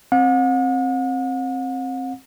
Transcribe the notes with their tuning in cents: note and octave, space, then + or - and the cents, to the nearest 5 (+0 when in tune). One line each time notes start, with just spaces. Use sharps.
C4 +15 F#5 -40